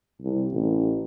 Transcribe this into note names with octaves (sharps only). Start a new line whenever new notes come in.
C2
A1